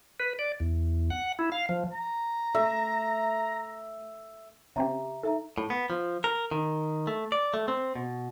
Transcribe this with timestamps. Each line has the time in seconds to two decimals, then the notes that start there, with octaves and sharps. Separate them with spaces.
0.20 B4
0.39 D5
0.60 E2
1.10 F#5
1.39 E4
1.52 F5
1.69 F3
1.92 A#5
2.55 A3 E5
4.76 C#3 C4 G4 E5 A#5
5.23 D#4 A4 E5 A#5
5.58 A2
5.70 B3
5.90 F3
6.24 A#4
6.51 D#3
7.07 A3
7.32 D5
7.54 A3
7.68 C4
7.95 B2